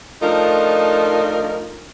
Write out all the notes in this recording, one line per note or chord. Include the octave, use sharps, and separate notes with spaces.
F3 A3 D4 D#4 F4 A#4